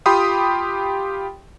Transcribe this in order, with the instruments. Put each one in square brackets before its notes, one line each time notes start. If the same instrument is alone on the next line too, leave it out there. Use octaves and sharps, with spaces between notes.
[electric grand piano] F4 G4 G5 B5 C6 D#6